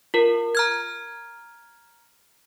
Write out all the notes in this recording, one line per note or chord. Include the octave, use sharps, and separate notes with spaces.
F4 A#4
A#5 F6 G#6